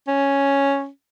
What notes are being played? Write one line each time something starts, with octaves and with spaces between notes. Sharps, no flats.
C#4